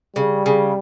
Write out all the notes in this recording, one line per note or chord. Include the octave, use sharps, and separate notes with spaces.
C#3 G3
C#3